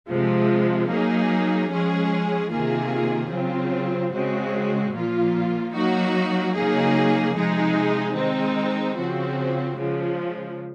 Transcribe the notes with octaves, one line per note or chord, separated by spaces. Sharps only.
C3 F3 G#3
F#3 A#3 D#4 G#4
F3 G#3 C#4 G#4
C3 D#3 A#3 F4 G#4
C#3 F#3 C4 F4
C#3 G#3 C4 F#4
A#2 F3 A#3 F4
F#3 A#3 D#4 F#4
C#3 F#3 A#3 D#4 G#4
C3 F3 G#3 D#4 G#4
D#3 G#3 C4 D#4
C#3 F3 C4 F#4
C#3 F3 G#3